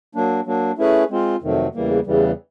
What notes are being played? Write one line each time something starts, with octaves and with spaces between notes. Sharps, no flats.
F#3 A#3 D4
F#3 A#3 D4
A3 C#4 E4 G#4 B4
G#3 C4 F4
F2 C3 D#3 F#3 A3
E2 C#3 E3 G3 A#3
E2 C#3 E3 G3